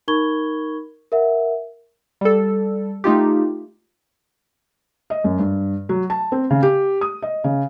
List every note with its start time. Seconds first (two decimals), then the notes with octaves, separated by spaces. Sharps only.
0.08 D#4 A#4 B5 C#6 G#6 G7
1.12 A#4 E5 F#5
2.21 G3 A4
3.04 A3 D#4 F4 G4
5.10 D#5
5.24 F#2
5.39 G2
5.89 F#3
6.10 A5
6.32 C4
6.50 C#3
6.63 G4
7.01 D#6
7.22 D#5
7.44 C#3